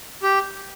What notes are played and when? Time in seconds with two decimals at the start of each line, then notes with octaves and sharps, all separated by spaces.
0.23 G4